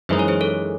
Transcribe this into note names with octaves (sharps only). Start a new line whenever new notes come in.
F#2 E3 G#3 D#4 C5
C#5
G#4 C5
A4 C#5